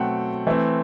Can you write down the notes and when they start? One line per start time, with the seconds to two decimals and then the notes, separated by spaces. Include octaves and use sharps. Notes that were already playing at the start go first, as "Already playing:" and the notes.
Already playing: B2 F#3 A3 C4 F#5 G5
0.47 E3 A3 C4